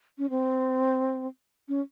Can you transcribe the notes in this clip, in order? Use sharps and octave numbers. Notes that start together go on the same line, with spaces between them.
C#4
C4
C#4